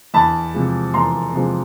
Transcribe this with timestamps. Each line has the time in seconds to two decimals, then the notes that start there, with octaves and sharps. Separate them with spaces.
0.14 E2 A5 B5
0.54 C3 F3 G#3
0.94 E2 A#5 C6
1.34 C3 F3 G#3